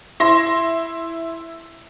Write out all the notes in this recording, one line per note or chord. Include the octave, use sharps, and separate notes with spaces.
E4 C6 A#6